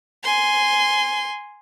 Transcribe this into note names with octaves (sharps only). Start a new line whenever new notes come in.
G#5 C6